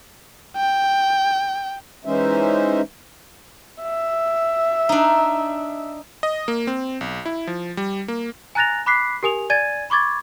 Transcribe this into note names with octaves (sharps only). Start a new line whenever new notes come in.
G5
E3 G#3 C#4 D#4 C5 E5
E5
D4 D#4
D#5
A#3
C4
B1
E4
F3
G3
A#3
G#5 A#5 F#6 A6 A#6 F7
B5 D6 F#6 B6 C7
G4 A#4 G#5 D#6 F7
D5 G#5 G#6 A6 D#7
B5 C#6 D6 G#6 A6